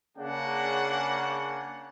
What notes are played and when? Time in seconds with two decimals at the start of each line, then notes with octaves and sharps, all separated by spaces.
0.18 C#3 A#3 D4 F#5